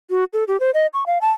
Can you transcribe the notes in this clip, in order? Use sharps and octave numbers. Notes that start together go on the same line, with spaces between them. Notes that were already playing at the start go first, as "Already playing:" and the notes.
F#4
A4
G4
C5
D#5
C#6
F5
A5